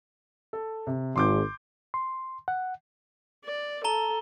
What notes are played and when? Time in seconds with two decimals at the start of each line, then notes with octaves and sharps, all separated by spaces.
0.53 A4
0.87 C3
1.16 G#1 C6 D6 G6
1.94 C6
2.48 F#5
3.45 D5
3.84 A4 A5 A#5 G7